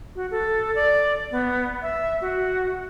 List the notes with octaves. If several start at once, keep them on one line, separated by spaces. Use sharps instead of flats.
F#4
A4
D5
B3
E5
F#4